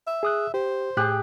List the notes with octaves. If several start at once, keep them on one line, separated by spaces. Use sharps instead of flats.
E5
G#4 D#6 F#6
G4 C5
A2 G4 G#4 F#6